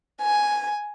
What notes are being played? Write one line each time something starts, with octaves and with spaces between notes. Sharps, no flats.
G#5